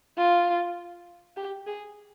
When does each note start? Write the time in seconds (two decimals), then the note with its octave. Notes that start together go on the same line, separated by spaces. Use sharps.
0.18 F4
1.37 G4
1.67 G#4